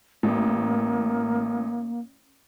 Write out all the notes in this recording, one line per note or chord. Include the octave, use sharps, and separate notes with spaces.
A1 A#3